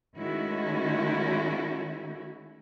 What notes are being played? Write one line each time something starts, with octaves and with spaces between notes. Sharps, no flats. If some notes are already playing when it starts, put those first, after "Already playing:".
D#3 G#3 A3 C#4 E4 F#4